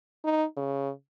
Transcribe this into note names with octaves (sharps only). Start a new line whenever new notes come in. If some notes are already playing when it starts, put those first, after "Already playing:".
D#4
C#3